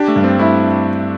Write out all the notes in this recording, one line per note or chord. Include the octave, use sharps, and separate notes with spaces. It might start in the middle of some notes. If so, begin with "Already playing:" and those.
Already playing: D4 G4
A3
G2
C4
A3 E4